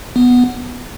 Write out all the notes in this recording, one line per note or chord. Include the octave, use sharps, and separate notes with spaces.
B3